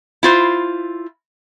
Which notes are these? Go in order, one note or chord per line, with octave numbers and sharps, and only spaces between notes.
E4 F4 C5